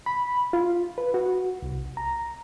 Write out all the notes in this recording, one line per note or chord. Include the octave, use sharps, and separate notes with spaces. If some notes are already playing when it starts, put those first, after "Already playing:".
B5
F4
B4
F#4
C2
A#5